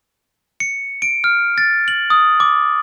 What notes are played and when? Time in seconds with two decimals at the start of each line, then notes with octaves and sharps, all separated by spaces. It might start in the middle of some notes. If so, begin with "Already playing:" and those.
0.60 C#7
1.02 D7
1.24 F6
1.58 A6
1.88 F#7
2.10 D#6
2.40 D6